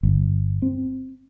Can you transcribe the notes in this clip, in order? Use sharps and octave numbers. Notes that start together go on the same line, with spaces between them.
G1
C4